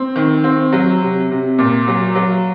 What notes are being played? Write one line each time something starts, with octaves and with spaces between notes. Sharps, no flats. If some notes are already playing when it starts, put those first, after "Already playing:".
Already playing: C4
D#3
C4
F#3
C3
C3
A#2
F#3
F#3